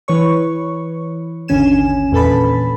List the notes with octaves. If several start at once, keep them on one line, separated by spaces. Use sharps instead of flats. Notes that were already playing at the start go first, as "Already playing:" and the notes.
E3 B4 C#5 C#6
G#1 D#2 D3 C#4 G#5 E7
E2 A#2 A4 B4 A5 B5